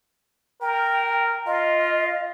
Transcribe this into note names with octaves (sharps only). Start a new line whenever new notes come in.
A#4 G5
F4 D#5